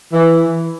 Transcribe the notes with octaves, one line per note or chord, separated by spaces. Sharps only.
E3